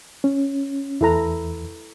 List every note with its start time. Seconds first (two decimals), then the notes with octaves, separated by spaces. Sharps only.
0.24 C#4
1.01 E2 E4 A4 A#5